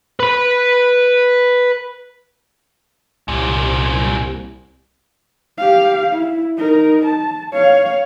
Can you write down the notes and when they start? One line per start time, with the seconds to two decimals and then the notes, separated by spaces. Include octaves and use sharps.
0.20 B4 B5
3.28 C2 F#2 A#2
5.58 G4 F5
6.13 E4
6.58 D#4 A#4
7.05 A5
7.53 C#5 F5